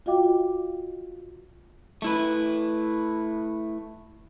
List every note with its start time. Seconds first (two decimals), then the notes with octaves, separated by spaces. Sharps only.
0.06 F4 F#4 D#5 F5 G5 D6
2.02 A3 E4 B4